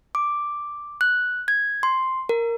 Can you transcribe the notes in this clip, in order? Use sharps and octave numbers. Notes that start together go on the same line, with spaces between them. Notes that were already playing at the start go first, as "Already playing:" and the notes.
D6
F#6
G#6
C6
A#4